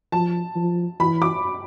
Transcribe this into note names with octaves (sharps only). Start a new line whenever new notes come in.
F3 A5
F3
E3 B5
D6